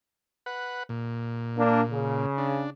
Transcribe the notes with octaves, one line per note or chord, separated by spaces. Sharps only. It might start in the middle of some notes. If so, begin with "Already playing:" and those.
B4 F#5
A#2
A#3 D4
C#3
D4